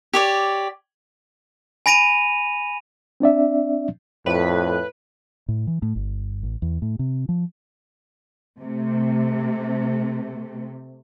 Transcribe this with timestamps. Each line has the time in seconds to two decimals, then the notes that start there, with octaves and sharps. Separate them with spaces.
0.13 G4 C#5 D5
1.86 G#5 B5 A#6 D7 D#7 F7
3.20 C4 D4 D5 E5
4.26 F2 A2 B4
5.48 A2
5.67 E3
5.82 A2
5.96 G1
6.43 A1
6.62 E2
6.82 A2
6.99 C3
7.29 F3
8.59 C3 A3